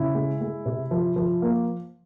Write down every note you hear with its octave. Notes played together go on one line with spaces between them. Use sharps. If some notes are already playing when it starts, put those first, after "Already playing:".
Already playing: C#3 E4
G#3
G#3
C3
F3
F3
A#3